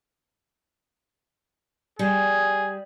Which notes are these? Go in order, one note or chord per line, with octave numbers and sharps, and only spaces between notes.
G3 G#4